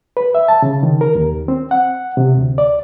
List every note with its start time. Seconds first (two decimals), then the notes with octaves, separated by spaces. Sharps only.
0.17 B4
0.35 E5
0.48 A5
0.62 C#3
0.83 D#3
1.01 A#4
1.15 D#2
1.48 C4
1.71 F#5
2.17 C3
2.37 D2
2.58 D5